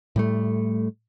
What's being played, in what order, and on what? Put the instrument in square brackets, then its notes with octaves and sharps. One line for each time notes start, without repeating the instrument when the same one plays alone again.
[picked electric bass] A2 G3 A3